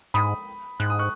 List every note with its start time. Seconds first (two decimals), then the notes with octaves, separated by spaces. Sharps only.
0.14 G#2 B5 D#6
0.80 G#2 F#6
0.90 D#6
0.99 C#6 F#6